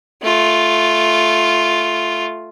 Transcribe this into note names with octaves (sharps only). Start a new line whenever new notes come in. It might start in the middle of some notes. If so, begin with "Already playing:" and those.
A3 F4